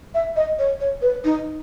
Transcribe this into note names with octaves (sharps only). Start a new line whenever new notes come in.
E5
D#5
C#5
C#5
B4
D#4